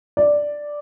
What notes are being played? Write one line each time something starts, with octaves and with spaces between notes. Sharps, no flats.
D5